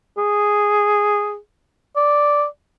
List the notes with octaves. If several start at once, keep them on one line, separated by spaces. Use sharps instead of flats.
G#4
D5